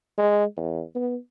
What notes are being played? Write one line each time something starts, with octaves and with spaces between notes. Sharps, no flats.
G#3
E2
B3